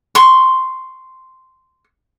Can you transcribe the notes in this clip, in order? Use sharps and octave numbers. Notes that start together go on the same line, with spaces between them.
C6 C#6